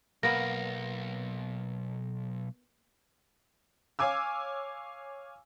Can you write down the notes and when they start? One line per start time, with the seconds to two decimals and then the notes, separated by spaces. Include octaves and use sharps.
0.23 B1 A#3 B3 A#6
3.99 C#5 F5 G#5 D6 E6